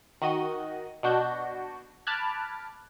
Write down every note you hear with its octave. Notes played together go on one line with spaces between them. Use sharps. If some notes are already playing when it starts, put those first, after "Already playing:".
D#3 F#4 D#5 D#7
B2 D4 F#4 G6
A5 B5 D6 F6 F#6 G#6